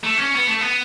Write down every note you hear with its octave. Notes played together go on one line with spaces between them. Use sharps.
A3
C#4
B3
A3
B3